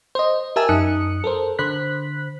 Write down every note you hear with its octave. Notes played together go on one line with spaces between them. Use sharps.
C5 D#5
G4 A#4 E5 G#5 A5 E6
F#2 D#4 D#6 F#6 C#7
A4 A#4 C5
D3 C5 B5 F#6 B6